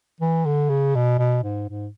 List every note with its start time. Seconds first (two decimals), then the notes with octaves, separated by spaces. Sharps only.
0.20 E3
0.46 D3
0.70 C#3
0.95 B2
1.18 B2
1.43 G#2
1.68 G#2